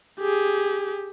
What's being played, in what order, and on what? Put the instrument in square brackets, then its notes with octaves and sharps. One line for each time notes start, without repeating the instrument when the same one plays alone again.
[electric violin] G4 G#4